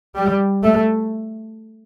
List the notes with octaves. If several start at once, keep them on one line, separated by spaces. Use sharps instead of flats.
G3
A3